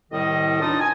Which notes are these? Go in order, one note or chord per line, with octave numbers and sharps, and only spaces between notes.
C2 A2 D#3 G3 D#5
C#2 D4 D#4 F4 A5 D#6
G#5